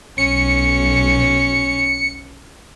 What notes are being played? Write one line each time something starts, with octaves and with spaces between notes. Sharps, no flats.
B1 C#4 C#7